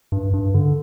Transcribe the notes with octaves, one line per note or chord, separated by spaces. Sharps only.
G2
G2
D3